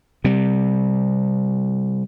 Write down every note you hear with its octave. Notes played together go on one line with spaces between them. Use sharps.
C3 G3